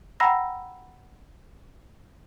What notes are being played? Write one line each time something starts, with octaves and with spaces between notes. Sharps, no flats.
F#5 G5 A#5 B5 E6 A#6